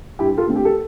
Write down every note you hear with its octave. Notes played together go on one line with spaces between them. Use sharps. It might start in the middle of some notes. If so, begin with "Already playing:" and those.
G2 E4 G4
G4
F4 A4
D3 A3 C4
G4
A4